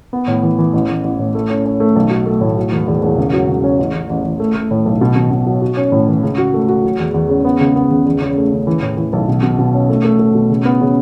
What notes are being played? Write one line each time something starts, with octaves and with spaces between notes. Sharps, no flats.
B3
A2
E3
E3
A1
A1
A1
A2
A3
C#4
C#4
A3
B1
F#4
A3
A2
F#3
E1
E2
E1
C#2
F#3
C#2
C#4
A1
A1
A1
A1
A3
A3
A2
B1
B2
B2
B2
F#3
F#4
C#4
A2
E3
C#2
F#4
A3
F#4
F#3
E2
E2
C#3
B3
C#2
B3
C#2
E2
C#3
A3
C#3
E3
A2
E3
B1
B2
B2
B2
C#4
A3
A3
A3
B2
C#3
B3
C#3